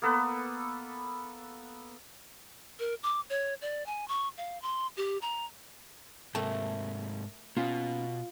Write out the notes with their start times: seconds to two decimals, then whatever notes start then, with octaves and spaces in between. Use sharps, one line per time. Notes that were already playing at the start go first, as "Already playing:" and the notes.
0.02 A#3 B3 A4 B4
2.79 A#4
3.03 D6
3.30 C#5
3.61 D5
3.86 G#5
4.08 C#6
4.38 F5
4.62 C6
4.97 G4
5.22 A#5
6.35 G#2 C3 A3 A#4 G5 A5
7.57 B2 A#3 C#4 D#4 F4